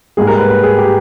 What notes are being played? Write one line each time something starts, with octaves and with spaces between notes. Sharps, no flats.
G#2 G3 A#3 G#4
A#4
B4
B4
G#4
G4